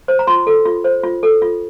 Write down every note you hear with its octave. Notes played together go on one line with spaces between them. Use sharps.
C5
A#5
F4 C6
A4
F4
C5
F4
A4
F4